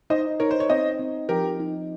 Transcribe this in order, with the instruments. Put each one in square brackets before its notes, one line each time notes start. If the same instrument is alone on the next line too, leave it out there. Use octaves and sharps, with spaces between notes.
[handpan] D#4 [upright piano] C5 D#5
[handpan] D#4 [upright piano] A#4 C#5
[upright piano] C5
C#5
[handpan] C4 [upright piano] C5 D#5
[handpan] C4
[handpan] F3 [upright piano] G4 A#4
[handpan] D#4